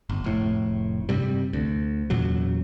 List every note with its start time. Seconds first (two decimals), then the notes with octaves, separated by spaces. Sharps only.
0.09 G1
0.24 F1 A2
1.09 G2 C3 G3
1.53 D2
2.10 E2 A#2 C#3 F#3